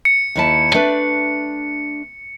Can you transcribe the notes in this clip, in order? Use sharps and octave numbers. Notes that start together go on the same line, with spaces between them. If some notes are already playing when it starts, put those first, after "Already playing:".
C#7
D#2 E4 A5
A3 D4 B4